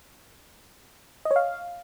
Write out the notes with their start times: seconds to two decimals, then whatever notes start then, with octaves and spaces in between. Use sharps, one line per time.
1.25 D#5
1.31 C#5
1.36 F5